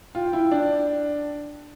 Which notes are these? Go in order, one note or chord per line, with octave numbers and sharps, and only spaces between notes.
F4 G5
E4
D4